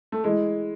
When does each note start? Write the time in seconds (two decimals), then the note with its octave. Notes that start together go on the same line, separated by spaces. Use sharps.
0.12 A3
0.24 E3 G#3